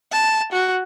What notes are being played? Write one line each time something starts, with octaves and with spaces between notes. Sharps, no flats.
A5
F#4